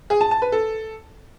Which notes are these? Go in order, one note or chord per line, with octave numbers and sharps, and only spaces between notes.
G#4
A5
A5
B4
A4